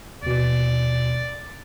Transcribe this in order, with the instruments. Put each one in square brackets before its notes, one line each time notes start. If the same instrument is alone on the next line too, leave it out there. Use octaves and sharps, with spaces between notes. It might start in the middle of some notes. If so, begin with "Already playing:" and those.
[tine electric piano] D#2 B2 [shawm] D5